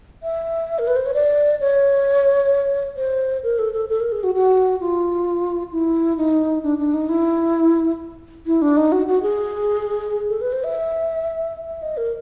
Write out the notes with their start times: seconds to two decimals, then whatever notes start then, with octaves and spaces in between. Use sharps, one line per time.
0.23 E5
0.79 A#4
0.87 B4
0.96 C5
1.06 C#5
1.14 D5
1.61 C#5
2.97 C5
3.43 A#4
3.59 A4
3.73 A4
3.89 A4
4.00 A#4
4.12 G#4
4.23 F#4
4.35 F#4
4.81 F4
5.72 E4
6.17 D#4
6.63 D4
6.79 D4
6.94 D#4
7.09 E4
8.46 E4
8.62 D4
8.77 D#4
8.92 F#4
9.08 F#4
9.23 G#4
10.29 A4
10.41 B4
10.53 C5
10.64 E5
11.67 E5
11.82 D#5
11.97 A#4